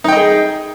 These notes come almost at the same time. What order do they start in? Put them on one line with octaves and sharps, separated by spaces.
D#4 G5 D#5 G#4